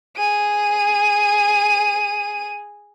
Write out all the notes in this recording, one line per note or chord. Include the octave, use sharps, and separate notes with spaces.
G#4 D#7